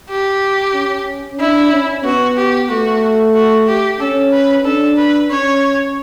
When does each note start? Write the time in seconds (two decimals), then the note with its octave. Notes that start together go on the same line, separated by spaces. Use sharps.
0.10 G4
0.74 C#4
1.40 D4 E4
1.72 C#4
2.05 B3 F#4
2.37 G4
2.70 A3 F#4
3.35 F#4
3.67 G4
4.00 C#4 A4
4.32 B4
4.64 D4 A4
4.97 B4
5.30 C#4 C#5